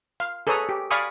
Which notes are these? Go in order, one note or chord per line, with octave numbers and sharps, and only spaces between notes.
F5
G#4 A4 B4 C#5 A#5 D#6
G4
D5 F5 G#5 B5 C#6 D#6